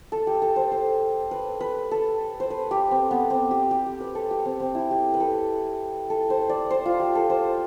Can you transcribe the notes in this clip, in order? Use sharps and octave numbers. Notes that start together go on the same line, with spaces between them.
A4
G4
A4
C5
C5
B4
B4
A4
C5
B4
G4
C4
B3
C4
G4
G4
G4
B4
A4
G4
C4
C4
E4
G4
B4
A4
A4
C5
D5
C5
F4
G4
A4
C5